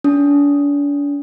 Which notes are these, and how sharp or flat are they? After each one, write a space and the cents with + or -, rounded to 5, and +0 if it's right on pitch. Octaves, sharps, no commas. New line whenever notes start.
D4 -40